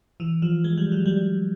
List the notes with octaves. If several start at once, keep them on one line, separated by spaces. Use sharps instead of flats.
E3
F3
G#3
G3
F#3
G3